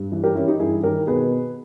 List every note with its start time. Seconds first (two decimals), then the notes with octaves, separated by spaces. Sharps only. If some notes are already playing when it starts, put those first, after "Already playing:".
Already playing: G2
0.12 E3
0.24 G4 A#4
0.35 E3 C#4 E4
0.48 D#4 G4
0.60 G2 E4 G#4
0.83 D#3 G4 A#4
1.07 B2 G#4 B4